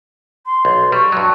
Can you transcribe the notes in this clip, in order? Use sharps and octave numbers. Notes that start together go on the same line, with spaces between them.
C6
B1
G3 C#6
G2 F#3